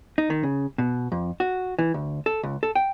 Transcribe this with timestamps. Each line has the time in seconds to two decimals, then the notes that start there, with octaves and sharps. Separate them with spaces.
0.18 D#4
0.30 D#3
0.43 C#3
0.78 B2
1.12 F2
1.40 F#4
1.79 E3
1.94 D2
2.26 A4
2.43 C#2
2.63 A4
2.75 G5